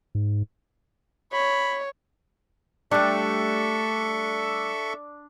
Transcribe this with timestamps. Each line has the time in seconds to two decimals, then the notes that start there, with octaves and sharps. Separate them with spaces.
0.15 G#2
1.33 C#5 B5
2.91 G3 A3 D4 A4 E5 C#6